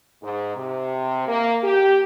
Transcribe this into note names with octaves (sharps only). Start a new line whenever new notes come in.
G#2
C3
A#3
G4